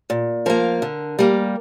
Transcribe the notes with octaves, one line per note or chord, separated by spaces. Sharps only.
A#2
F3 A#3 A#4
D3
G3 A#3